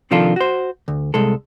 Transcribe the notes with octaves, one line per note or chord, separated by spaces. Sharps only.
C3 D#3 F3 D4 F4 A4
F#4 C5
D2
C2 G#3 A4